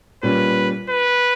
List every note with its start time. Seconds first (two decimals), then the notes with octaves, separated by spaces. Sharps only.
0.23 A#2 G3 C#4 B4
0.89 B4